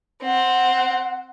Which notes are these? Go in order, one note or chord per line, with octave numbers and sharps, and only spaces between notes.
C4 F#5